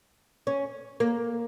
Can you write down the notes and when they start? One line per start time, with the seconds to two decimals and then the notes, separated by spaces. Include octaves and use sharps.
0.47 C#4
1.00 A#3